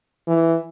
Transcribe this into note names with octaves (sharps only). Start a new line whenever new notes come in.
E3